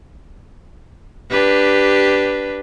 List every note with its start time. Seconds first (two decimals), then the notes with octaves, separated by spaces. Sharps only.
1.30 D4 G4 B4